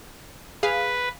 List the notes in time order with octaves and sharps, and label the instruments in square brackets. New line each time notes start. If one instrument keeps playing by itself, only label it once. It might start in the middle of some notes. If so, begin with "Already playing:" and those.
[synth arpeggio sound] G#4 F5 [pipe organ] B4